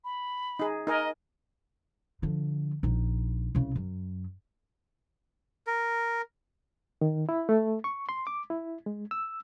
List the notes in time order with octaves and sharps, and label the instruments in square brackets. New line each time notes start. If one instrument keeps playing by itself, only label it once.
[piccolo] B5
[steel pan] D#4 G#4
[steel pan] D#4 A#4 G#5 [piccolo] D#5
[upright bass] D3 F3
A#1 D#4
C2 C#3
F#2
[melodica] A#4
[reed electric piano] D#3
E4
A3
C#6
C6
D6
E4
G#3
E6